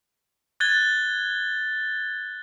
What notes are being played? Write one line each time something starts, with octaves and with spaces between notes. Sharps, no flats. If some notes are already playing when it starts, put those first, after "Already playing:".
F#6 G#6 A6 G7